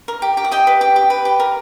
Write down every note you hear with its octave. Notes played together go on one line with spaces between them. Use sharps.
A#4
G4
G4
F#5
G4 D#5 G5
B4
G4
G4
B4
G4
A#4